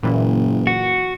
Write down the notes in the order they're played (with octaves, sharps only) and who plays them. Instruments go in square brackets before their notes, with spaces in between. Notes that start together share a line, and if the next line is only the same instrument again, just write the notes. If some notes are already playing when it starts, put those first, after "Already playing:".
[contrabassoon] F#1 [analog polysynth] A#2 E3
[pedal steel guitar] F#4